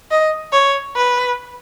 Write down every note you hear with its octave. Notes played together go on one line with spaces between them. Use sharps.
D#5
C#5
B4